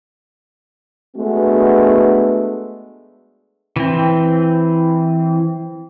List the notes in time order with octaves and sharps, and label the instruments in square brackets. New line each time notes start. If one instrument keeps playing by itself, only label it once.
[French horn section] G#3 A3 B3 D4 F#4
[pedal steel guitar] E3 C4